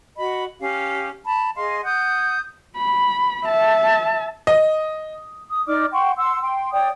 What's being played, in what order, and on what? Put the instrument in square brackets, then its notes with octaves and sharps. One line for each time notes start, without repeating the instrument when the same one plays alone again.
[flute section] F#4 D#5 B5
C#4 G4 F5
A5 B5
G#4 D#5 F5 C6
F#5 D#6 G6
[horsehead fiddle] B5
E5 A5
[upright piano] D#5
[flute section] D#6
D#4 D5 D6 F6
F#5 G5 C6 C#6
F#5 C6 E6
G5 C6
C#5 D5 G5 D#6